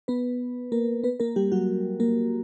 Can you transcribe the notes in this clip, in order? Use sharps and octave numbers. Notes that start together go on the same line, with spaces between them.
B3 B4
A#3 A#4
B3 B4
A#3 A#4
G3 G4
F#3 F#4
A#3 A#4